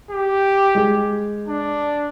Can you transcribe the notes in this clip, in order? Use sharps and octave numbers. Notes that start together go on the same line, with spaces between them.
G4
G#3 G#4
D4